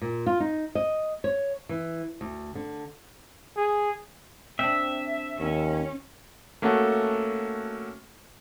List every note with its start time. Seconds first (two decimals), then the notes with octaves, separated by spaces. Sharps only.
0.01 A#2
0.26 F4
0.40 D#4
0.75 D#5
1.24 C#5
1.69 E3
2.21 D2
2.55 D3
3.57 G#4
4.59 C4 D4 E5
5.39 D#2 C#4
6.62 A3 A#3 C#4 F#4 A4 F#5